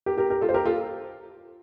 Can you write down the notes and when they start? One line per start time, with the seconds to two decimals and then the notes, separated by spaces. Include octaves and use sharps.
0.06 G4 A#4
0.18 G4 A#4
0.30 G4 A#4
0.41 F4 A4
0.49 C5
0.54 G4 A#4
0.65 F4 A4